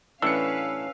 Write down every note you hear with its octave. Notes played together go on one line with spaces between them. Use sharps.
A2 E3 C#4 D4 B4 F5 E6 C#7